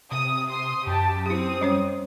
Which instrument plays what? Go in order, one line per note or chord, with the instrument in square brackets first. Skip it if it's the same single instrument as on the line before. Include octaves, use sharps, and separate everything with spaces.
[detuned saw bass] C3 [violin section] D#6
[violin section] C6 D#6
[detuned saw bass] F#2 [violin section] G4 A5
[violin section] C4 D#6 [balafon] E4 G4
[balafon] G3 C#4 C#5